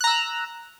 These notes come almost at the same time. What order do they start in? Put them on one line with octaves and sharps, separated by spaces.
F#6 A#5 E6